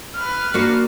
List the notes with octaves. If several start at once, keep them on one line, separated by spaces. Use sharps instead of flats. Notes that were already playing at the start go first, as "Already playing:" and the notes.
B4 F6
A#3 D4 F#4